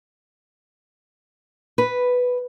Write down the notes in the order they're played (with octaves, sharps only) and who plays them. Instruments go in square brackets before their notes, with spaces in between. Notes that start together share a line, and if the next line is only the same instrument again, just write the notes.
[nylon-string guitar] B4